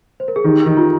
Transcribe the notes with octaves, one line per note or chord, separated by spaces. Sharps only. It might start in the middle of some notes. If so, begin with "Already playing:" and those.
C5
A#4
G#4
D#3 G4
D#3
F4